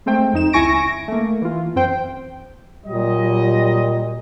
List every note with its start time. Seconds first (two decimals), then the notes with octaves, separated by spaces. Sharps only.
0.06 G#3 A3 C4 C5 G5
0.33 F2 D#4 E7
0.53 C#2 E4 G#5 C#6 A#6 D7
1.08 A3 A#3
1.42 E3 F4
1.76 F#2 C4 C5 G5
2.85 A#2 F#3 G3 D#5